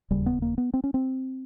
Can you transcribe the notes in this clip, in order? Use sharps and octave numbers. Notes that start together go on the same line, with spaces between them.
E1 D#2 C#3 G3
B3
A#3
B3
C4
C#4
C4